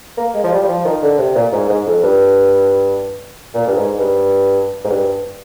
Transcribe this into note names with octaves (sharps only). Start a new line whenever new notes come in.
A#3
G#3
F3
G3
G3
F3
D#3
D3
C3
A#2
G#2
G#2
F2
G2
A#2
G2
G#2
G2
G#2
G2